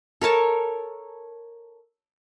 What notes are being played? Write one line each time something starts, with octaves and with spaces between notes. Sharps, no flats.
A4 A#4 C#5 A5